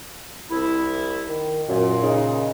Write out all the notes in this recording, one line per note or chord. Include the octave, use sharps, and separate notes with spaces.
C2 E4
D#3
F#2 A#2 F4
C#3 D#4